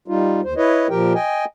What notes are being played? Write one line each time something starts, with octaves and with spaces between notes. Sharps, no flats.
G3 D#4 F4
D#2 C5
E4 B4 C#5 D#5
A#2 F3 G4 A#4 G5
D#5 G5 G#5